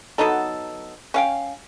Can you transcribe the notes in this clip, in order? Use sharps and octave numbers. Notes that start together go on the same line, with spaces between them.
F#3 B3 D#4 A4
C#4 F5 G5